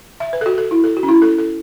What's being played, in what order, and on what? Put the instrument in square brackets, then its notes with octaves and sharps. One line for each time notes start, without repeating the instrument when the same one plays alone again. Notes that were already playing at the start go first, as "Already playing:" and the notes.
[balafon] E5
B4
A4
F#4
A4
E4
A4
F#4
C#4
E4
A4
A4